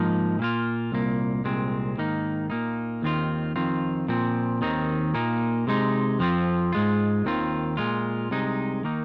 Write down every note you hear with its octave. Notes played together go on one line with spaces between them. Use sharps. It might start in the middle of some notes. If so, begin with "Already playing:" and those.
Already playing: G#2 F3 A#3 D#4
A#2 A#3 F4
C2 A#2 A#3
C2 A#2 G#3 C4
G#2 D#3 A#3 D#4
A#2 A#3 D#4
D#2 D#3 C4 F4
F2 D#3 C4 F4
A#2 F3 C4
D#2 D#3 C4 D#4
A#2 A#3 D#4
C3 G#3 D#4
F2 F3 C4 F4
G#2 G#3 F4
D#2 D#3 C4 F4
A#2 G#3 F4
C2 C3 G#3 D#4
D#3 A#3 D#4